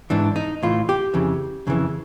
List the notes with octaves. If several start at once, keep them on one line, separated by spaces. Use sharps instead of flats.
G#2 E3 D4
D#4
A2 E3 F4
G4
F2 C#3 E3
F2 C#3 E3